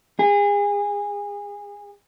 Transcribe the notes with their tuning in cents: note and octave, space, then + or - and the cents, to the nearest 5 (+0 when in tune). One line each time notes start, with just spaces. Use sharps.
G#4 -30